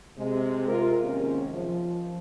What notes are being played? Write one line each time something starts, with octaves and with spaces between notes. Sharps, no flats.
C3 G#3
F4 A#4
D#2 G#2 C3 C#4
F3